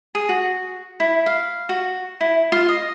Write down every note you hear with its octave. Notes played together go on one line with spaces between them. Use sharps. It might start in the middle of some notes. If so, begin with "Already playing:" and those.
G#4
F#4
E4
F5
F#4
E4
F4
D#5